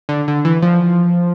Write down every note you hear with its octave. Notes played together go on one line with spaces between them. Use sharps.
D3
D3
E3
F3